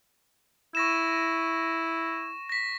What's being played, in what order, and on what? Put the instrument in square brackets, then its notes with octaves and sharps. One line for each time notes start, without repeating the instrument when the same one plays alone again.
[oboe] E4 [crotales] C#6 A#6 E7
[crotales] A#6 B6